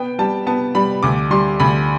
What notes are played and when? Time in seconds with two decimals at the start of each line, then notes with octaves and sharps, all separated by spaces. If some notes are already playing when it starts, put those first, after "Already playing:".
Already playing: B3 G5
0.19 G3 A5
0.47 B3 A5
0.75 G3 B5
1.03 D2 D6
1.31 G3 C6
1.60 D2 B5